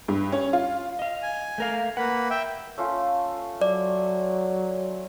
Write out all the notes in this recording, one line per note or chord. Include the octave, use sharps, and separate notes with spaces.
G2
C#4
F4
D#5 F5
G#5
A3 A#4 F5
A#3 B4 F#5
E5 G5
A3 C#4 F4
F#3 D5